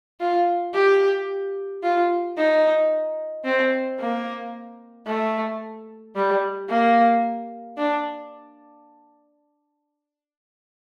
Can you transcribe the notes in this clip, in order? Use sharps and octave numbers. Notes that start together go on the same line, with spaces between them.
F4
G4
F4
D#4
C4
A#3
A3
G3
A#3
D4